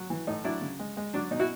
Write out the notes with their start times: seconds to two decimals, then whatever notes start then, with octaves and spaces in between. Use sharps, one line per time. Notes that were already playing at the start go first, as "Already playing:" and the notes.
Already playing: F#3
0.10 E3
0.27 A2 D#4
0.44 F#3 D4 E4
0.61 C#3
0.79 G#3
0.97 G#3
1.14 F#3 D4
1.31 B2 D#4
1.39 E4 F#4